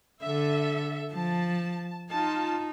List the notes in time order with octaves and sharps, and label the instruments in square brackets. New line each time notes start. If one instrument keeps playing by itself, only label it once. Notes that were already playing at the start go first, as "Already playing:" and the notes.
[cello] D3 [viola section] A4 E5
[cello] F3 [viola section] A5
[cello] D#4 [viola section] F4 A5